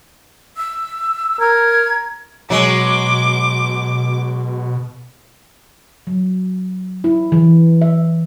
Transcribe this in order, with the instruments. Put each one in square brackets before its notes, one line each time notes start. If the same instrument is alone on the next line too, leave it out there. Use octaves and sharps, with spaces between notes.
[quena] E6
[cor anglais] A#4 [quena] G#6
[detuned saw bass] B2 [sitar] F#3 G#3 [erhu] D6
[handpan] F#3
E4
E3
E5